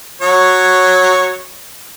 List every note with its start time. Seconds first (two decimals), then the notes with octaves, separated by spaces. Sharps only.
0.22 F#3 C#5